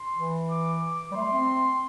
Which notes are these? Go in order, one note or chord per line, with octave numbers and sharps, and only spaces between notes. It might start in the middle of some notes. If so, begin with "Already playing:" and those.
Already playing: C6
E3
D6
D6
G3
A3 C6
C4